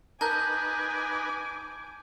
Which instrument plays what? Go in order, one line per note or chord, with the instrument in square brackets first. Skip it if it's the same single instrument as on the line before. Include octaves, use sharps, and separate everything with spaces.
[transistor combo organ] D#4 B4 [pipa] A#4 [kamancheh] G#5 D6 [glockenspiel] A5 G6